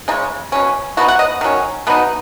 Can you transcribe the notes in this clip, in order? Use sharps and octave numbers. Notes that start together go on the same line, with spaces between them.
C#3 G#3 C#4 D#4
B2 F#3 C#4
B2 B3 D#4 F#4
F#5
D#5
D#3 F#3 C#4
B2 B3 D#4